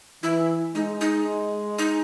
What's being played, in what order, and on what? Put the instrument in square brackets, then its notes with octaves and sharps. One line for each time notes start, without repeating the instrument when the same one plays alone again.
[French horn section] E3 [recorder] E4
[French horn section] G#3 [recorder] D#4
[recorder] D#4
D#4